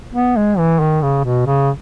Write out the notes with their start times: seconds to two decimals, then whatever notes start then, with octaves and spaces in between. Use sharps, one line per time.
0.14 B3
0.37 G#3
0.58 E3
0.80 D#3
1.02 C#3
1.24 B2
1.46 C#3